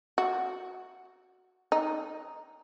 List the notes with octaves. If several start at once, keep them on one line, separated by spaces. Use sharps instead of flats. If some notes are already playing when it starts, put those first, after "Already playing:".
F#4
D#4